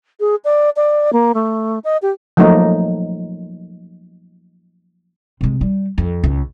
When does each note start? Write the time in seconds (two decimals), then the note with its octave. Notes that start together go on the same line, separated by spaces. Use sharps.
0.20 G#4
0.44 D5
0.76 D5
1.13 A#3
1.34 A3
1.84 D#5
2.02 G4
2.37 F3 F#3 A3 A#3 D#4
5.41 C3 G#3
5.61 G3
5.98 F2
6.24 C#2